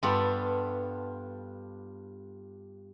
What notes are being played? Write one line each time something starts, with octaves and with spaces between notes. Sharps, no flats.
G2 G3 B3 D4 F4 A4